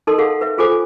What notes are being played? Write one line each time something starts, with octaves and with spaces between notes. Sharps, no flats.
D#4 A4 A#4 D#5 A5 C6
G#4 A4 F5 F#5
B4 E5
F4 G#4 A4 C5 G#5 D6
A4 G#5